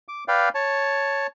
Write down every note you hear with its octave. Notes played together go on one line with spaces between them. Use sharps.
D6
B4 D5 F5 G5
C#5 A5